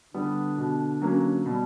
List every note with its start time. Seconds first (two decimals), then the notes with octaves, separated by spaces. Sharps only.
0.14 D3 G3 B3 D4
0.58 B2
1.02 F#3 A#3 C#4
1.45 B2 G3